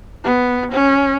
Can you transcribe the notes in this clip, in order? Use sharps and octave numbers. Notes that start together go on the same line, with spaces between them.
B3
C#4